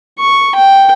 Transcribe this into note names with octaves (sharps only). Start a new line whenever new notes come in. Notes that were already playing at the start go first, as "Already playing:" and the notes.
C#6
G5